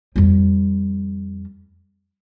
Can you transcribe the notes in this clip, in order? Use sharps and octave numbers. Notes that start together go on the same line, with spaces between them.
F2 G3